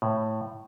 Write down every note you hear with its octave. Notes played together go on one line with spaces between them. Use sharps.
A2